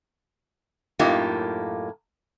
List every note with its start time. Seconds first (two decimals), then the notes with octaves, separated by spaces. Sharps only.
0.99 F#2 A2 A#3 D#4 F4 G4